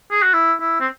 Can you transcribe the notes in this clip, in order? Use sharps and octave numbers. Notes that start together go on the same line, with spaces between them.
G#4
F#4
E4
E4
C4